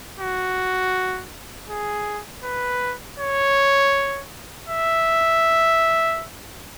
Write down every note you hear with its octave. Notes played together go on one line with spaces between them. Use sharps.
F#4
G#4
B4
C#5
E5